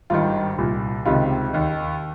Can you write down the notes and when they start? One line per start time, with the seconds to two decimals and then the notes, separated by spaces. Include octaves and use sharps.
0.10 G#1 G2 D#3 F4
0.58 C2 A#2
1.06 C#2 C3 D#3 F4
1.53 D#2 D#3